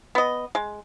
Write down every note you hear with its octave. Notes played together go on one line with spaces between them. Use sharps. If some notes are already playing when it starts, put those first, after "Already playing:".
B3 D#5
G#3